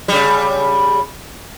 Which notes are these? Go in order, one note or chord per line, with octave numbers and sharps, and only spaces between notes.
C#3 G3